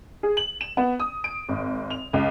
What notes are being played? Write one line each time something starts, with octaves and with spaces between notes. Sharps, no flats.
G#4
F#7
E7
B3
D#6
D7
G#1
F7
C#2